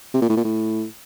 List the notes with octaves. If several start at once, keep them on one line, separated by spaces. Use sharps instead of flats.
C3
A#2
A2
A#2
A2